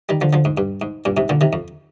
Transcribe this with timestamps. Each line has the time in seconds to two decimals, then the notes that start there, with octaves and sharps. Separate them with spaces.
0.09 D#3 G3
0.21 D3 F3
0.33 D3 F3
0.45 G#2
0.57 G2
0.81 G#2
1.05 G2 A#2
1.17 G#2 C3
1.29 A#2 D3
1.41 C3 D#3
1.53 F2